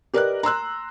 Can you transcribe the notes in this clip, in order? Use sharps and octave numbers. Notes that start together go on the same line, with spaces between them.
G4 A#4 B4 D5 D#5 F#6
A#5 C6 E6 F#6